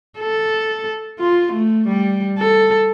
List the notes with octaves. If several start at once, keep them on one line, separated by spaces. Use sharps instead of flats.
A4
F4
A3
G3
A4